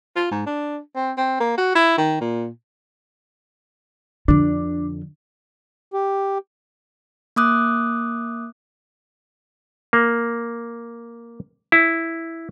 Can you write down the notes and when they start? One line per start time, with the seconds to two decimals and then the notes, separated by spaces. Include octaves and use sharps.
0.16 F4
0.31 G#2
0.47 D4
0.96 C4
1.17 C4
1.40 A#3
1.58 F#4
1.75 E4
1.98 D#3
2.21 A#2
4.28 F2 D3 D4
5.93 G4
7.36 A#3 D6 D#6 F#6
9.93 A#3
11.72 E4